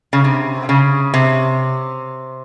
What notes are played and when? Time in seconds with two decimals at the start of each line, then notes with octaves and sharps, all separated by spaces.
0.13 C#3
0.24 C3
0.69 C#3
1.14 C3